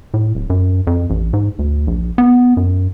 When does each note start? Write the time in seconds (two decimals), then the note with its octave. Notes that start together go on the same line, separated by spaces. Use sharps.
0.14 A2
0.35 D1
0.50 F#2
0.87 F2
1.10 A1
1.33 G#2
1.59 D2
1.87 A#1
2.18 B3
2.57 F#2